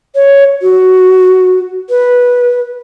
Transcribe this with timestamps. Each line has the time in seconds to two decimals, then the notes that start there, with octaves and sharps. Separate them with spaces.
0.15 C#5
0.62 F#4
1.89 B4